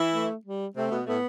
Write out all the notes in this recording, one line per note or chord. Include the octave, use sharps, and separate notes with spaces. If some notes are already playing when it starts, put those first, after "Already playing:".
Already playing: E3 E4
A3
G3
C3 A3 C4
B2 B3
A2 A3 B3